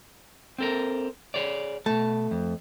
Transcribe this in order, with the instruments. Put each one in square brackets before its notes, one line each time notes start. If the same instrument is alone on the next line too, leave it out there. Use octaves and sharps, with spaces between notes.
[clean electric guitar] C4 A4 A#4
G#4 C#5 D5
[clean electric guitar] B2 A5 [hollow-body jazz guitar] A3
[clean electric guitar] F2